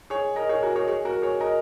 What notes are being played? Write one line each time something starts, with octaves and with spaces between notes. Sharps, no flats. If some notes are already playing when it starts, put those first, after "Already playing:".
G#4 C#5
A#4 D#5
G#4 C#5
F#4 A#4
G#4 C#5
G#4 C#5
F#4 A#4
G#4 C#5
A#4 D#5